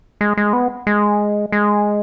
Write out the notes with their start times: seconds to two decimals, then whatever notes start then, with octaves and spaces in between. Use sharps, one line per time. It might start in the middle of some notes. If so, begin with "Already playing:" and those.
0.21 G#3
0.37 G#3
0.53 B3
0.87 G#3
1.52 G#3